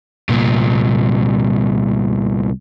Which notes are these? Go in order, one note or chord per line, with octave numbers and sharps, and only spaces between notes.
C2 A#2